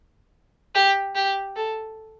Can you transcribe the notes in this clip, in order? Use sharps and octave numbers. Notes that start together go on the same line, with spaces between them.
G4
G4
A4